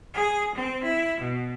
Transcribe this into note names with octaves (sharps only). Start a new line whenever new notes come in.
G#4
C4
E4
B2